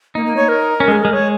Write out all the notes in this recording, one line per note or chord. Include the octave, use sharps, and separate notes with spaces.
A#3 D#4
A#3
C#5
A#4
C#4
G#3
G#4
G#3 A#4
G#3 C#5